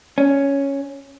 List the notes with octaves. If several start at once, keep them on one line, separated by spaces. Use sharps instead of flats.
C#4